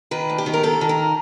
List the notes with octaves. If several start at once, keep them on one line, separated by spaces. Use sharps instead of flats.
D#3 B4
D2
G4
D#3
A#4
D#3 A4
D#3
A#4